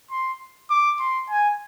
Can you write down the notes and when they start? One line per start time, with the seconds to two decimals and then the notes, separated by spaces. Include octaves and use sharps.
0.11 C6
0.70 D6
1.00 C6
1.30 G#5